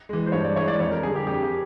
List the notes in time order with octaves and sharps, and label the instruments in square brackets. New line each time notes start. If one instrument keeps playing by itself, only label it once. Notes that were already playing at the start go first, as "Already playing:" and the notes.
[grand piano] E3 G#3
[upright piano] C5
[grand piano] G2 [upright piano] C#5
[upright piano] D5
[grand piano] E3 G#3 [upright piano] C#5
[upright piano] D5
[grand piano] F2 [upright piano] C#5
[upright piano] A#4
[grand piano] D3 G3 [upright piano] G#4
[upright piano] G4
[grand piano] F2 [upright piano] G4
[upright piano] G4